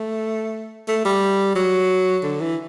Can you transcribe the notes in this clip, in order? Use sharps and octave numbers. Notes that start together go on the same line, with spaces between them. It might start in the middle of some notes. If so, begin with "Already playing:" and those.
Already playing: A3
A3
G3
F#3
D3
E3